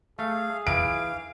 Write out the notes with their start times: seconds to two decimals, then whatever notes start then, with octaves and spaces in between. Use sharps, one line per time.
0.19 A3 G#4 F5
0.67 E3 F5 D7